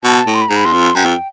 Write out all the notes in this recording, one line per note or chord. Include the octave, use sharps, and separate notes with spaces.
B2 A5
A2
C6
B5
G#2 A#5
B5
E2 C6
F2
F#2 G5
F2